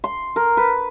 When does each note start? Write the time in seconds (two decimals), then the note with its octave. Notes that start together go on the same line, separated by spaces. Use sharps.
0.04 C6
0.36 A#4
0.57 B4